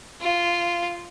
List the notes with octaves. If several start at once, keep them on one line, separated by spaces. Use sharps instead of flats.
F4